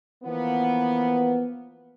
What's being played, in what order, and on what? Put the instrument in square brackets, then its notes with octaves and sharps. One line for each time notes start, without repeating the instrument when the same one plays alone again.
[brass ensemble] E3 F3 A#3 B3